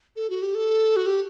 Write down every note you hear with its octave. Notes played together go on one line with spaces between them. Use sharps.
A4
F#4
G4
A4
F#4
G4